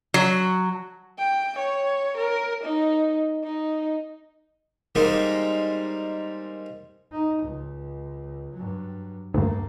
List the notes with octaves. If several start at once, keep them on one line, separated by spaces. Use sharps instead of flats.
F#3
G5
C#5
A#4
D#4
D#4
D#3 G3 G#3 A#3 C4 D#4
D#4
C#2
G2 F#3
D2 G2 A3 A#3